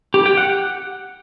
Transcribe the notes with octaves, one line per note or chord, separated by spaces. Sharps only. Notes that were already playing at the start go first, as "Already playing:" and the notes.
G4
G5
F#5